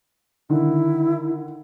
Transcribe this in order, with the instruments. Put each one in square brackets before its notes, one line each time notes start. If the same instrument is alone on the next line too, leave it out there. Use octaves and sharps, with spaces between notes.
[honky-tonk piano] D3 D#3 [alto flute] E4